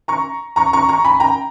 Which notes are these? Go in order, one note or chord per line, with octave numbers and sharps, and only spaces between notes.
A#5 C#6
A#5 C#6
A#5 C#6
A#5 C#6
G#5 B5
G5 A#5